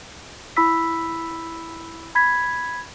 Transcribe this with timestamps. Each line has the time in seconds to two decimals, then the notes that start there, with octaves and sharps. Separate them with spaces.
0.57 E4 B5 E6 B6
2.15 B5 G#6 B6